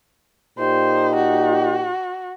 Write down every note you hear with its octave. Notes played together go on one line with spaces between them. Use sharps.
A#2 D#4 G4 C5
F#4